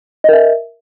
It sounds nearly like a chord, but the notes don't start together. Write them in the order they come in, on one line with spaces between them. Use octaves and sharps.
D#5 A#4 E5